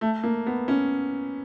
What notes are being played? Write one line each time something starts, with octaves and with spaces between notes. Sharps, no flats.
A3
A#3
B3
C#4